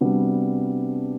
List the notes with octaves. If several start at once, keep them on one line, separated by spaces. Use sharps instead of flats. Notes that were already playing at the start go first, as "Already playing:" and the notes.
C3 G3 B3 D4 F#4